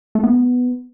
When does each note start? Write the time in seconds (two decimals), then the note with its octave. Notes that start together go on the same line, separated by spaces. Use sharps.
0.15 A3
0.23 B3